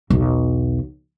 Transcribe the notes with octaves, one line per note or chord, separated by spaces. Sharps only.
B1 E2